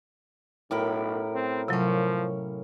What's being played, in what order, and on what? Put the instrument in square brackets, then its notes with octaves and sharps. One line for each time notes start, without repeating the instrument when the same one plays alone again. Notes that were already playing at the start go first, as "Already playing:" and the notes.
[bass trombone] B1 [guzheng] F#2 G4 [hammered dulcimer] A2 A#4 B5
[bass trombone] C4
[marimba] C3 F#3 [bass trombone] F3 [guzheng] A#3 C#4